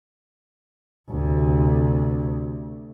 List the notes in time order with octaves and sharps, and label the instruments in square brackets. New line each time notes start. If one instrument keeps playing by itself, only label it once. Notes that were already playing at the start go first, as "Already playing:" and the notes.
[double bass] D2 C3